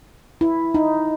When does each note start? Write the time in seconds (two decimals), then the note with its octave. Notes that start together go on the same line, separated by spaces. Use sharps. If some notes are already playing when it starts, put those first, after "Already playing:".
0.41 E4
0.74 D#4